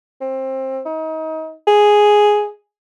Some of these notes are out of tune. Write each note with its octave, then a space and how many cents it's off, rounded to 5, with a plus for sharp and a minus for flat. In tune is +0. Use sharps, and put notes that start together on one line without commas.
C4 +20
D#4 +30
G#4 +0